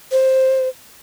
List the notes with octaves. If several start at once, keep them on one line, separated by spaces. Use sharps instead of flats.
C5